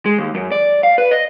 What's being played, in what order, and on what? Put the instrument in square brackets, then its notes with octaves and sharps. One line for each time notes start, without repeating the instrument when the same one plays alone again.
[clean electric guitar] G#3
D#2
F#2
D5
F5
B4
D#5